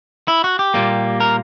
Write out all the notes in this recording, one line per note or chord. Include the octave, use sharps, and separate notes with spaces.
E4
F#4
G4
A#2 G3 A#3
A#4